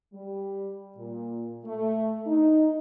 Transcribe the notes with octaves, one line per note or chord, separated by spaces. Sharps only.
G3
A#2
A3
D#4